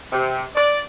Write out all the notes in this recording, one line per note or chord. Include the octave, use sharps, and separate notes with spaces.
C3
D5